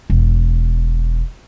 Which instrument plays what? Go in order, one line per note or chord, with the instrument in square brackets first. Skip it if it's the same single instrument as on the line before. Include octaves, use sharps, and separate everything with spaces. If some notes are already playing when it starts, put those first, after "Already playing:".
[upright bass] E1